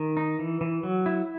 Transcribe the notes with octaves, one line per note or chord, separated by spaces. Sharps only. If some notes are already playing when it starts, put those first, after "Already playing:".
Already playing: D#3
D#4
E3
E3
F#3
E4